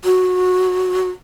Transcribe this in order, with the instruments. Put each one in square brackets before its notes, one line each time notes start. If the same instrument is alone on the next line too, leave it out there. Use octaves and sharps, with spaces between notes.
[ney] F#4